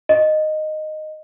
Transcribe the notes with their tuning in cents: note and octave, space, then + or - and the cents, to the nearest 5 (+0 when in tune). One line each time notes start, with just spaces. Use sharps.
D#5 -10